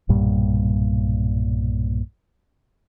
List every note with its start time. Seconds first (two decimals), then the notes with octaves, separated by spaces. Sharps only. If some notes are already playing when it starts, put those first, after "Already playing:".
0.09 B1 G2 A#2 G3